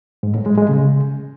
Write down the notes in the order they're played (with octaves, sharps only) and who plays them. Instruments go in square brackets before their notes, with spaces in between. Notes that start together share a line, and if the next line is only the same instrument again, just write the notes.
[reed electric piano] G#2
A2
G#3
G#3
C#3